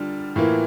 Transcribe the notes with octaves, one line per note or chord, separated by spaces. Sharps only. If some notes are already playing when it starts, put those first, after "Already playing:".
Already playing: D3 G3 D4 F4 F6
A2 E3 A#3 F4